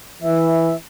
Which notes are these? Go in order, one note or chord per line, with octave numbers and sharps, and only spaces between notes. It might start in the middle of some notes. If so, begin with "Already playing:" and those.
E3 E5